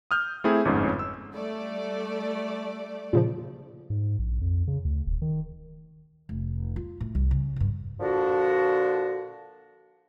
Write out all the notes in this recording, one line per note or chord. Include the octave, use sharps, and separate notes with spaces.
D#6 F6 G6
A3 C4 E4 G#4
G1 F2 G#2 C#4
E6
G3 A3 D5
A#2 C#3 F3
G#2
A#1
F2
C#3
D2
D#1
D#3
F1
F4
A2
C2
C#3
B1 G2
A#2 D3 F3 D4 F#4